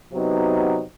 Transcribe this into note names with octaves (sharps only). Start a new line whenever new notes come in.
C3 F#3 B3 D#4